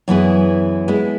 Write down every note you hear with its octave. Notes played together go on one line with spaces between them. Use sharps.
F#2 E3 B3 E4 G#4
G#3 B3 E4